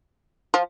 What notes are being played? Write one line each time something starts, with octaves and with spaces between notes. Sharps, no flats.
F3 F4